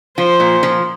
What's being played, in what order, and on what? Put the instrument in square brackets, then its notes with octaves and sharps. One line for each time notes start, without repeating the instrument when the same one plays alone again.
[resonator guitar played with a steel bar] F3 [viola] C5
[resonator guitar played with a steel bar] A#2
F3